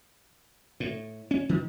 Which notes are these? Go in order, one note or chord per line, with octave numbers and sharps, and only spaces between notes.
A2
C#4
D#3